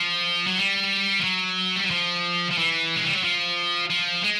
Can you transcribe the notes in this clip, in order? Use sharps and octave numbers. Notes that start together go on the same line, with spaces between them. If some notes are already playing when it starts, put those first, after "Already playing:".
Already playing: F3
F#3
G3
F3
F#3
G3
F#3
F3
F3
E3
G#3
G3
F#3
F3
F3
G#3